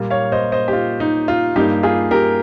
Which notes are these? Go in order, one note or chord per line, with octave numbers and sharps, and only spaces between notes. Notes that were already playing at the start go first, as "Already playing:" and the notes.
Already playing: A#2 G3 A#3
C#5 F5
C5 D#5
C5 D#5
G4
F4
D#4
F4
G2 G3 A#3 D#4 G4
F4 G#4
G4 A#4